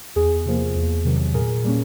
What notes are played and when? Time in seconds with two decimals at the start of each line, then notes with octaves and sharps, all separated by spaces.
0.16 E2 G#4
0.46 C3 F3 A#3
0.75 E2
1.05 C3 D#3 F#3
1.34 A#2 G#4 A#4
1.64 G3 A#3 C#4